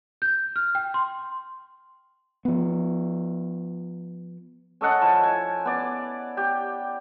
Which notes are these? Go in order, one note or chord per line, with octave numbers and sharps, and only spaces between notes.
G6
F6
G5
C6
F3 B3
C#4 A4 D#5 F#5
F3 E4 A5
G#5
B3 D5
G4